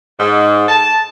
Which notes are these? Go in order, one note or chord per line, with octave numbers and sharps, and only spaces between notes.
G#2
A5